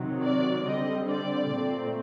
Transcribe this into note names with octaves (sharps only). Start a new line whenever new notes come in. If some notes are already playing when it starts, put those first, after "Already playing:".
Already playing: C3 D#3 F#3
D5
D3 G3 C4 D#5
D5
A#2 A3 C4